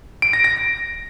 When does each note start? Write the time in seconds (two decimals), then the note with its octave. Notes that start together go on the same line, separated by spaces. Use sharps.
0.22 D7
0.33 A#6
0.44 A#6